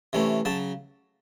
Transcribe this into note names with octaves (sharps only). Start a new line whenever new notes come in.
C3 E3 A3 C#4
C#3 F#3 A5